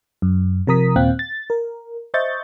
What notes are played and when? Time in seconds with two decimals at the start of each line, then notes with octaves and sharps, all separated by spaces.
0.22 F#2
0.67 C3 F3 A#4 A#5 D#6 B6
0.96 D#2 A#2 C4 F5 G5 F#6
1.19 A6
1.50 A#4
2.14 C5 D#5 E5 C#6 G6 A6